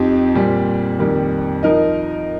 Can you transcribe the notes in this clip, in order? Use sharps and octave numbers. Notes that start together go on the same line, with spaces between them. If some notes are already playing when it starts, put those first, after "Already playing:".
Already playing: F2 F3 C4 D#4 G4
A#2 G3 C4
F2 D#3 G3 A#3
F3 D#4 A#4 D#5